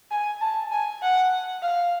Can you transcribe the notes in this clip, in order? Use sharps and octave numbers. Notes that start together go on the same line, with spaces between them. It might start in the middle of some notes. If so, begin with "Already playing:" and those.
G#5
A5
G#5
F#5
F5